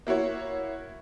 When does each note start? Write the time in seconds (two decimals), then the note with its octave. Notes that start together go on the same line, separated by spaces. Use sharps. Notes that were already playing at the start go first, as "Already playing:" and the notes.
0.07 A#3 E4 F#4 C#5